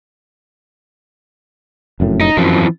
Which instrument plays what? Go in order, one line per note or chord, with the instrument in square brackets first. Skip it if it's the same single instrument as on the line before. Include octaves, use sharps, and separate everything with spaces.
[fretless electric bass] F1 F#2 A2
[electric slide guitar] D#4
[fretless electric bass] F#2 [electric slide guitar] E3 F3 C4